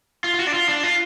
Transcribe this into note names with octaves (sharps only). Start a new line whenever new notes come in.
F4
F4
F#4
D4
F4
D4
F4